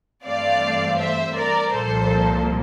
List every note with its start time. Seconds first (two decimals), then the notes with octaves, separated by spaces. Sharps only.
0.24 G2 E3 A3 C4 D5 F5
0.98 C5 E5
1.36 A#4 D5
1.72 C2 A#2 F3 A#3 A4 C5